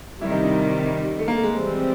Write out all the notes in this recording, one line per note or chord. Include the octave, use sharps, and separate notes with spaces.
C3 D#3 G3 E4
D#4
D#4
A3
A#3
A3
G#3
E3 G3 C4